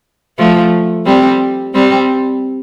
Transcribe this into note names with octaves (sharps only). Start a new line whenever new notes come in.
F3 A3
G3 C4
G3 C4